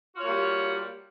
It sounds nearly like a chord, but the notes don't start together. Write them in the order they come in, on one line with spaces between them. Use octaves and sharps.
F#4 F4 C#5 A#3 G3